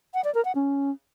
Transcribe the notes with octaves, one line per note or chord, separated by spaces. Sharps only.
F#5
D5
A#4
F#5
C#4